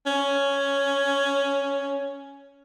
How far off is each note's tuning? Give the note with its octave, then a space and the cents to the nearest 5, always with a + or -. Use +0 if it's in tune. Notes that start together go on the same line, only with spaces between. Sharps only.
C#4 +5